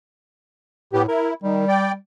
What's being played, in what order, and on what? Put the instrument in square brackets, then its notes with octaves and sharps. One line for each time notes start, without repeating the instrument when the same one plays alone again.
[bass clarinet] A2 [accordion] B3 G4
[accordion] E4 [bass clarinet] A#4
[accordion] D#3 [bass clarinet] G3
[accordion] D5 G5